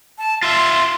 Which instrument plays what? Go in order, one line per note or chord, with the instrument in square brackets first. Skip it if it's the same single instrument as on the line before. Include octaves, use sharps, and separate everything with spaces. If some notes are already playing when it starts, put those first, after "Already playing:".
[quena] A5
[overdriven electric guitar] F4 E5 [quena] C6